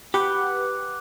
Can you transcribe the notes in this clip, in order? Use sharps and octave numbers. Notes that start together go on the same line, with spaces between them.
G4 B4 F#5 G5 D6 F#6